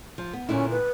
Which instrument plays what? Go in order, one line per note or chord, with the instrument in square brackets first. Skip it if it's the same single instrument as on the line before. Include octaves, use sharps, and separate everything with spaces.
[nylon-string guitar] F3
B3
[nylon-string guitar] A#2 D3 E4 [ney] C#4
[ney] B4